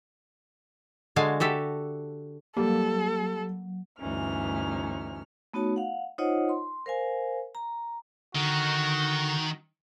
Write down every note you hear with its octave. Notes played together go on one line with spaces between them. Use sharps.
D3 G#3 F#4 F5 G#5 A5
F#4 G4 A4 E5
F#3 G3 A#3 A4
D2 G2 E3 C#4 D#4 F6
A3 B3 D#4 F#4 C#5 A5
F5 F#5
D#4 F4 C5 C#5 D#5 F#5
C6
A#4 C5 F5 G#5
A#5
D3 D#3 F#4